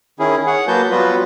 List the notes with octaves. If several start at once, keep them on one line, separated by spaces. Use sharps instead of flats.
D#3 C#4 E4 G#4
G#4 C#5 F#5
F#3 A#3 F#4 B4 A5 G6
F#3 G3 B3 F4 F#4 B4